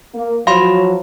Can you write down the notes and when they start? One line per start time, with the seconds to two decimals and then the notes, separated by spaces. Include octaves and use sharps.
0.14 A#3
0.47 F3 F#3 F5 B5 C6